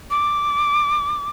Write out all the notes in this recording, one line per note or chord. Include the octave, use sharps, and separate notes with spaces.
D6